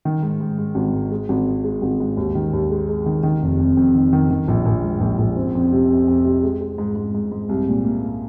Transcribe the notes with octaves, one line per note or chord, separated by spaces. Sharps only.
D#3
G#2
G#2
G#2
G#1
G#2
G#3
G#1
G#2
G#3
G#1
G#2
D#2
D#3
D#2
G#3
G#3
D#3
D#3
F1
F2
F2
D#3
D#3
D#3
A#1
A#1
G#2
A#1
A#1
C4
F2
C3
F2
F2
C3
G#3
G#3
G#2
G#2
G#2
G#2
C2
A#2
A#3
A#3